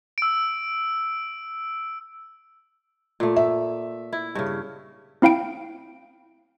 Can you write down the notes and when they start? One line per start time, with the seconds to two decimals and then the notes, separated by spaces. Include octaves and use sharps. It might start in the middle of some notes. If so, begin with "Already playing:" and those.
0.18 E6 D7
3.20 A#2 A3
3.36 E5
4.13 E4
4.35 G2 C#3
5.22 C4 E4 F5 G5 D7